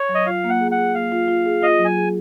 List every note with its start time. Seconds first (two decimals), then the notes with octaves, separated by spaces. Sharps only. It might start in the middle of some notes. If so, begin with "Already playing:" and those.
Already playing: C#5
0.09 F#3
0.15 D#5
0.26 F4 F5
0.44 A#3
0.50 F#5
0.61 G#4
0.72 F#5
0.78 G#4
0.95 A#3 F5
1.12 F4
1.28 F4
1.46 G#4
1.63 F4 D#5
1.79 F#3
1.85 G#5
1.97 G#4